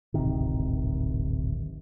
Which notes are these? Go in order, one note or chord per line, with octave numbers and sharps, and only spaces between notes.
D1 G#1 C3 D#3